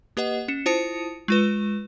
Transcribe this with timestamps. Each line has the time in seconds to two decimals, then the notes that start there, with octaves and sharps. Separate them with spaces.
0.17 A#3 G4 B4 D#5 F#5
0.48 C#4 C#7 E7
0.66 E4 F4 C5 A5 D#6 C#7
1.28 G#3 F4 B4